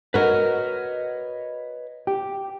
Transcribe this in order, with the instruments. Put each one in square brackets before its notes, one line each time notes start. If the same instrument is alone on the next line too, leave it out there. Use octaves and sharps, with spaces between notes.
[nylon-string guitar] F#4 A#4 [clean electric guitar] B4 C#5 D#5
[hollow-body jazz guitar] G4